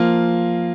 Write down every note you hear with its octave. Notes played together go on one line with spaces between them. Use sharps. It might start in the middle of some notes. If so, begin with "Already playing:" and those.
Already playing: F3 A#3 F4